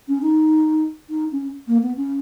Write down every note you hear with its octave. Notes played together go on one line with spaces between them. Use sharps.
C#4
D#4
D#4
C#4
A#3
B3
C#4